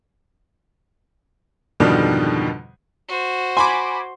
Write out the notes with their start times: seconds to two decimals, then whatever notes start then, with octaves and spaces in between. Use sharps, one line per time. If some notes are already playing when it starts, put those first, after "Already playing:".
1.80 F2 G#2 B2 D3 D#3 G3
3.08 F#4 C5
3.57 G#5 B5 C6 D6